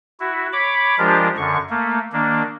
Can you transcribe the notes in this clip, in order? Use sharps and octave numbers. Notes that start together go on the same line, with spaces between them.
E4 F#4
C#5 B5 D6
F3 G#3 D4 F4 G4 A#4
F#2 D3 C#6
A3 A#3
D#3 A#3 D4